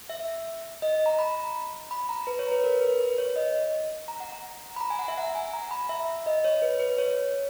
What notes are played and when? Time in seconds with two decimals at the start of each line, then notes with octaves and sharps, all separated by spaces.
0.09 E5
0.82 D#5
1.06 A#5
1.19 B5
1.91 B5
2.09 A#5
2.27 B4
2.39 C#5
2.52 B4
2.64 A#4
2.81 B4
3.00 B4
3.18 C#5
3.36 D#5
4.08 A#5
4.20 F#5
4.32 A#5
4.76 B5
4.81 A#5
4.90 G#5
4.99 F#5
5.08 E5
5.18 F#5
5.35 G#5
5.53 A#5
5.71 B5
5.89 E5
6.26 D#5
6.44 C#5
6.62 B4
6.80 B4
6.98 C#5